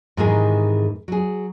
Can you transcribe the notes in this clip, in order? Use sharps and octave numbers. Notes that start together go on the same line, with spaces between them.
G#2 C3 D#3 E3 G#3 G#4
F#3 G#4